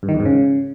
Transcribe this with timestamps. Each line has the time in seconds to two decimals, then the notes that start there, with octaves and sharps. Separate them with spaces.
0.03 G2
0.09 D#3
0.14 E2
0.20 G#2
0.25 C#3